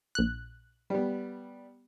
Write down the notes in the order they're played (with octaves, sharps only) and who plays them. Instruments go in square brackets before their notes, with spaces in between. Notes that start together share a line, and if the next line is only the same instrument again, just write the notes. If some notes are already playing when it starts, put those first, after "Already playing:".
[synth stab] A#1 F#6
[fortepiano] G3 B3